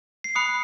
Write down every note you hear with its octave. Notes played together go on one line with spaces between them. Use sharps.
C7
B5 D#6 F#6 C#7